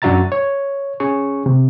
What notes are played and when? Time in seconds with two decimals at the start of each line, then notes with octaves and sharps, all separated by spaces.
0.02 F#2 D4 F#4 E5 A#5 A6
0.32 C#5
1.00 C#4 G#4 C#6
1.46 C3